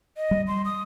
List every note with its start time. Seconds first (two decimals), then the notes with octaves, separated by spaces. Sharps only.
0.17 D#5
0.31 G3
0.48 C6
0.65 D#6